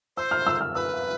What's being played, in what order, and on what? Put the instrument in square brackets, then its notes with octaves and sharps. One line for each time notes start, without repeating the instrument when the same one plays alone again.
[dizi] C5 [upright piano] E6
[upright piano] F6
E6
F6
[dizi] B4 [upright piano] E6